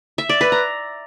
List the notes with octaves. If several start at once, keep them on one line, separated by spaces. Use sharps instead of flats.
E5
D5
B4
A#5